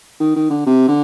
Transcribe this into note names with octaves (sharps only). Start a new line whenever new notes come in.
D#3
D#3
D3
C3
D3